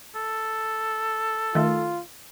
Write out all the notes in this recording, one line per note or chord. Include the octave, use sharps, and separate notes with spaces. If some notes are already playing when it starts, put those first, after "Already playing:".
A4
D#3 A3 F4